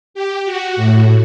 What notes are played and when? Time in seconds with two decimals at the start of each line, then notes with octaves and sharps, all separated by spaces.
0.14 G4
0.45 F#4
0.76 A2